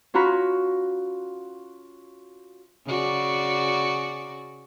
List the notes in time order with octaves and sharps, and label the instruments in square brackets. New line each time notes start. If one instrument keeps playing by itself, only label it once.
[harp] C#4 F4 F#4 A#5 B5
[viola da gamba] C#3 F#4 D5